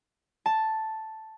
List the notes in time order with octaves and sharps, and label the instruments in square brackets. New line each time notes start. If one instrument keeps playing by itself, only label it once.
[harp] A5